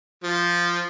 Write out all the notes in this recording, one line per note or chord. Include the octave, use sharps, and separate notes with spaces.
F3